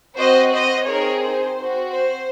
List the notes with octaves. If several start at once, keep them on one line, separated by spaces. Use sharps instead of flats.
C4 F#4 C5 D#5
C5 D#5
C4 D#4 G#4 A#4 C#5
C5
C4 F#4
C5